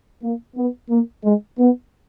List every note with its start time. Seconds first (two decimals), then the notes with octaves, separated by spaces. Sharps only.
0.23 A#3
0.57 B3
0.90 A#3
1.24 G#3
1.59 B3